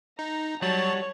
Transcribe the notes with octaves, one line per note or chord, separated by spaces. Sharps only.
D#4 A#5
F#3 G3 F#4 C#5 A5 A6